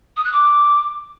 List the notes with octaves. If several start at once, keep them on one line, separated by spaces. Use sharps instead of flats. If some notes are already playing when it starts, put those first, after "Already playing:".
D#6
F#6
D6